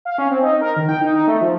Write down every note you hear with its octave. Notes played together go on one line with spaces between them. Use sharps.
F5
C#4
C4
D#4
A#4
D#3
G5
D#4
D#4
A3
F3